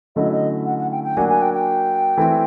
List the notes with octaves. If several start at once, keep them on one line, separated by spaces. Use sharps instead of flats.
D3 F#3 A3 C#4 E4 D#5
D#5
F#5
F#5
G5
G5
F#3 A#3 D4 F#4 G#5
G#5
G5
G5
E3 A3 C4 E4